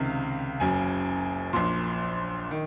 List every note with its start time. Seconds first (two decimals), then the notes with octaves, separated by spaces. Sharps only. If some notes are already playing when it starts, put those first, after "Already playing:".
Already playing: C#2 C3 D#3 F5
0.60 F#1 F#2 C#3 G#5
1.53 A#1 A#2 C6
2.51 D#3